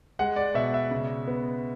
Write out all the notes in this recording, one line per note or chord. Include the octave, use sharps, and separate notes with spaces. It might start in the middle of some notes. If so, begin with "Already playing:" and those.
G#3 F#5
D5
B2 E5
E5
C#3
B3